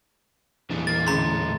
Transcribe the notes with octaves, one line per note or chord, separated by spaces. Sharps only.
E2 A#2 E3 D4 G#4
A#3 A6
A2 D3 C#4 G#4 A#5 C6